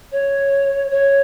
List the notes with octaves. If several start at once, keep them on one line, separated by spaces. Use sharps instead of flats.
C#5
C#5